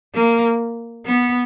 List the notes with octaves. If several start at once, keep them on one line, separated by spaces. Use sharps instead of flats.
A#3
B3